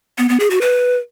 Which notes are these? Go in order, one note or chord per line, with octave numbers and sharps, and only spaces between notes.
B3
B3
G#4
F#4
B4